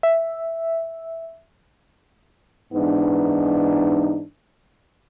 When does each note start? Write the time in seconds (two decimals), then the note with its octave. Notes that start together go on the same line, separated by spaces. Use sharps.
0.03 E5
2.74 G#2 E3 B3 D4 D#4